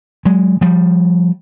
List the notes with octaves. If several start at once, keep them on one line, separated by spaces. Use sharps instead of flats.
F#3 G#3
F3 G3